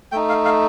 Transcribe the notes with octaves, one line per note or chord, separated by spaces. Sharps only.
A3 D#4 G5
F5
F5